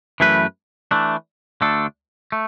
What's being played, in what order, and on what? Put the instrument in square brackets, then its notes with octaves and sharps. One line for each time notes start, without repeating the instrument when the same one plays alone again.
[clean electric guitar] F#2 E3 A3 E4 B4
E3 A3 D4
D2 D3 A3 D4 A4
A3